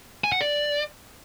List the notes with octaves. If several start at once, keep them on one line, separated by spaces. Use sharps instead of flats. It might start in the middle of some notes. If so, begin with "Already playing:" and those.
G#5
F#5
D5